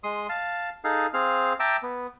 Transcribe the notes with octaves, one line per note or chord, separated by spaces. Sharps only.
G#3 C6 D#6
F5 A5
D#4 G#4 A4 F5
C4 G#4 F5 F6
E5 G5 A5 A#5 D6 E6
B3